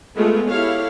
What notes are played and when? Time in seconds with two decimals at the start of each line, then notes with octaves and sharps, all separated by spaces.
0.16 G#3 A3 B3 F4
0.49 E4 G4 A4 C#5 F5